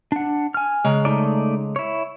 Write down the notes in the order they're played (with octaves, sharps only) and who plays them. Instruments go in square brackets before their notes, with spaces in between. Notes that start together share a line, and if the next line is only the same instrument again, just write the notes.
[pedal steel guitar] D4 F#5
G#5 F6
[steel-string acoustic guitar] C#3 G#3 A#5
[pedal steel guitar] A3 D#4 D5
E4 C#5